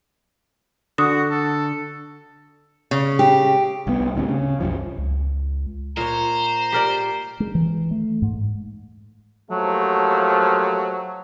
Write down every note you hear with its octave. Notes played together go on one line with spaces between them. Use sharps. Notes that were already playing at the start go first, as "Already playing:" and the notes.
D3 F#4 D#6
A4
C#3
G4
C2 B3
D1 D2 A2 C3
C#3
C2 F#2 F3
C#2
A#2 C5 C#5 A#5
G4 A#4 D5
G#3
E3
A3
G#2
D#2 F3 F#3 A3